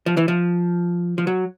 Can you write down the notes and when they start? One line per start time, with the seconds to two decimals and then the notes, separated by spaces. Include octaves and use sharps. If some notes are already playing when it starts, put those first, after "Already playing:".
0.06 F3
0.17 E3
0.28 F3
1.18 F3
1.27 F#3